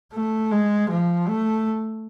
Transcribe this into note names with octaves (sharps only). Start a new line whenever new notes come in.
A3
G#3
F3
A3